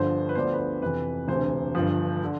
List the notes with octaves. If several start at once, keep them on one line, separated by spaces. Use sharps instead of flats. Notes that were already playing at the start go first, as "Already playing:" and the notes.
Already playing: G1 G2 D3 F3 C5
B4
D2 D3 F3 B3 D4 C5
B4
C5
F2 C3 E3 B4
E1 D2 C3 C5
G1 G2 F3
D3